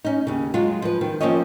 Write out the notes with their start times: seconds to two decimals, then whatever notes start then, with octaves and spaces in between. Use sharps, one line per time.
0.04 C#4 D#4
0.27 D#2 C#3
0.54 F#3 G#3 F4
0.82 F3 B4
1.01 D#3
1.21 F3 A#3 C4 C#4 C#5 D#5